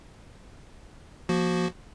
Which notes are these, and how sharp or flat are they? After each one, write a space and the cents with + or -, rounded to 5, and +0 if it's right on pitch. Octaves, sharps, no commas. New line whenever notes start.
F3 +0 A#3 +25 F#4 +0